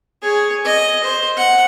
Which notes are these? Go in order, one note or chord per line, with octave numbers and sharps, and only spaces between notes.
G#4 C#5
D#5
C5
F#5